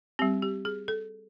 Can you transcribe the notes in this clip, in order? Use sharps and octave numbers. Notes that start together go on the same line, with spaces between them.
G3 C4 G4
G4
G#4
A4